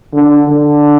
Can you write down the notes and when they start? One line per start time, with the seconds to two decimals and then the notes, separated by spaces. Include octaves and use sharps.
0.13 D3
0.48 D3